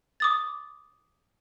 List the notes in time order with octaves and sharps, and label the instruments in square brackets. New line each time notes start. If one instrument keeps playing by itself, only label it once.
[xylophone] D6 D#6 A6